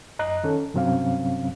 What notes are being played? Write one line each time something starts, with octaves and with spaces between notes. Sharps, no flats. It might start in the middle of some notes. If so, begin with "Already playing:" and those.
F#2 D#5 A#5 F#6
D#3 C#4 A4
G2 C3 F#3 C4 C#4 F5